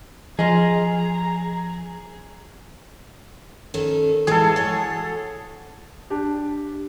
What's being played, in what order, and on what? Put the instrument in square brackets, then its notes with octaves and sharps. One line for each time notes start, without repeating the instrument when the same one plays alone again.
[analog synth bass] F3 [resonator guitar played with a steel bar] F4 D#5 [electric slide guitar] G#4 [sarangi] A#5
[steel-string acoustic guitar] D#3 C#4 A4
[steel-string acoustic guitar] A2 E3 G#3 [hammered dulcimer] G#4 A4
[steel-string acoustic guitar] F#4 C#5
[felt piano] D4 G4